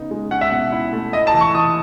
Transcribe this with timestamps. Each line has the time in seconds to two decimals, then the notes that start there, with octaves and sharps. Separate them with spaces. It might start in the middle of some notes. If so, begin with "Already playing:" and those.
Already playing: C#3 B3 D#4
0.11 G#3
0.31 C#4 F#5
0.41 E5
0.50 B2 F#5
0.72 E4
0.93 A3
1.13 E4 D#5
1.27 A5
1.34 E3
1.41 C#6
1.55 E3 D#6